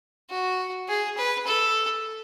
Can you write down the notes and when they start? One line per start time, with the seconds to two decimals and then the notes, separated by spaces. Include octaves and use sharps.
0.30 F#4
0.89 G#4
1.17 B4
1.47 A4